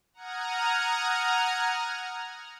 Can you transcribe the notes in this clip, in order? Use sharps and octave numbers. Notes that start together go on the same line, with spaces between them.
F#5 A#5 D#6 F6 G#6